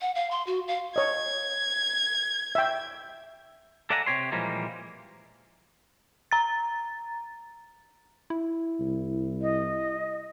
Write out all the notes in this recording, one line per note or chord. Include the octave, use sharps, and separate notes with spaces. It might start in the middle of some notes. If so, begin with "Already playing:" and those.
F#5
F5
C6
F#4
F5
C#5 D#5 G#6
E5 G5
A4 D5 E5 F#5 G#5 A#5
C3 G4 C#5 C6
A#2 E3 F3 G3 G#3 A#3
A#5 A6
E4
C2
D#5